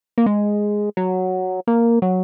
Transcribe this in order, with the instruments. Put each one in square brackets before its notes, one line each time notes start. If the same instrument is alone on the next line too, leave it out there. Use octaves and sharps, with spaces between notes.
[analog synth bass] A#3
G#3
F#3
A#3
F#3